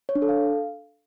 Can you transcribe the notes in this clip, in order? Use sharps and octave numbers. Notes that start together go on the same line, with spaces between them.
C#5
D4
A4
F5